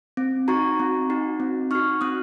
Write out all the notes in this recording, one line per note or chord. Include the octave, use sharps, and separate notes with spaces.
C4
D#4 F#4 A#5 C#6
C4
D#4 F#4
C4
D#4 F#4 C#6 F6
C4 D#6 F#6